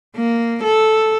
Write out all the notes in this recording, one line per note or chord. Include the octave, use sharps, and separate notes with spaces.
A#3
A4